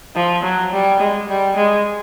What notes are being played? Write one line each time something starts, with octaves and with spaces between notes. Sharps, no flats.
F3
F#3
G3
G#3
G3
G#3